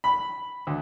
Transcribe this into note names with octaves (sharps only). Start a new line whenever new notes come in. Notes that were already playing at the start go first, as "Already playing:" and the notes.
B5
D2